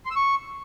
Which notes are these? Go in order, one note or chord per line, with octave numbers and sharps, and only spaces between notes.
C6
E6
C#6